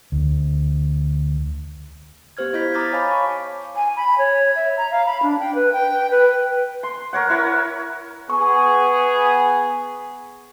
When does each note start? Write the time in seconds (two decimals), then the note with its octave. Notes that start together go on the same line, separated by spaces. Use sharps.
0.12 D2
2.37 B3 G4 C5 F6 G#6
2.53 E4 F4 D#5 G6 G#6 B6
2.74 A#5 D6 D#6 F6 A6 B6
2.93 C#5 F5 G#5 A5 B5 D6
3.11 C#6
3.76 G#5
3.96 B5
4.18 C#5
4.56 E5
4.77 A#5
4.91 F5
5.06 B5
5.23 D4
5.39 G5
5.55 B4
5.73 G5
6.11 B4
6.83 C6
7.13 A#4 C#5 F#5
7.30 E4 A#4 C#5
8.30 B3 G#4 C#6